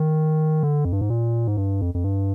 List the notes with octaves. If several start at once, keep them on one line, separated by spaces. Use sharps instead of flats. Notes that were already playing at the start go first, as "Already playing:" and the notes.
Already playing: D#3
D3
F2
G2
G#2
A#2
G#2
G2
F2
F2
G2